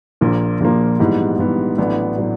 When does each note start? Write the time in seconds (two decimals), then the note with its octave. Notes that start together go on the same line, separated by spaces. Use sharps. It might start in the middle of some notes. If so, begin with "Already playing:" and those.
0.21 A#1 A#2 F3 A#3
0.60 A#1 A#2 F3 A#3
0.99 G#2 E3 G3 B3
1.39 G#2 E3 G3 B3
1.78 A1 A2 F#3 B3 D4
2.17 A2 F#3 B3 D4